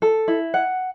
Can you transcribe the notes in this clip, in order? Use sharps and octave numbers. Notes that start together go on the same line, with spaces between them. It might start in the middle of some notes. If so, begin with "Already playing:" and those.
A4
E4
F#5